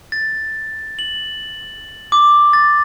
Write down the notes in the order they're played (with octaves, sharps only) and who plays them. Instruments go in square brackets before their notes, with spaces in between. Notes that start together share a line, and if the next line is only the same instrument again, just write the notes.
[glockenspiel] A6
F#7
D6
A6